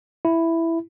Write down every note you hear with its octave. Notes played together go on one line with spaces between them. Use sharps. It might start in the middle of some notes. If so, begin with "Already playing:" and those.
E4